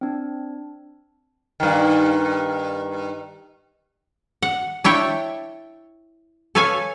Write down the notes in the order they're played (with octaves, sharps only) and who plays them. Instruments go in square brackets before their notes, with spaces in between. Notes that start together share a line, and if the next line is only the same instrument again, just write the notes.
[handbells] C4 D4
[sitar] G2 D#3
[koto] F#5
D4 E4 C#5 G5
A4 B4 C#5 F5 G#5